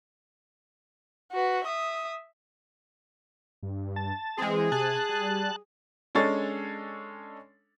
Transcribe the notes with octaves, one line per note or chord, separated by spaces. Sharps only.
F#4 B4
E5 D#6
G2
A5
E3 G#3 C4 G#4
C3 G#5 A5 F#6
G3
G#3 C#4 D4 A4 C#5 A6